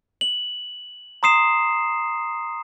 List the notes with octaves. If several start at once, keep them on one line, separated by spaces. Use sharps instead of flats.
F#7
A#5 C6 D#6 C7 E7